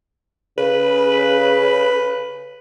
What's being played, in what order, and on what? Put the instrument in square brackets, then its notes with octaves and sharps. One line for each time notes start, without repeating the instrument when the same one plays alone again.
[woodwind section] C#3 [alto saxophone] B4